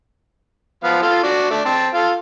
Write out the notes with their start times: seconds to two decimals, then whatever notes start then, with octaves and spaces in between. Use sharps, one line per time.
0.84 F3 B3 F5
1.02 F4 A4 F5
1.23 D4 F#4
1.51 A3 D4
1.65 C4 A5
1.94 F4 A4 F5